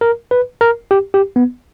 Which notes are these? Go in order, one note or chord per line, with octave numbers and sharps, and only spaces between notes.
A#4
B4
A#4
G4
G4
B3